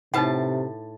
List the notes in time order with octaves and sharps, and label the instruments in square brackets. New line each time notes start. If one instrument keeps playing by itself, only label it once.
[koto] A2 A5 [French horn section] C3 [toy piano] D#4 B4 F#5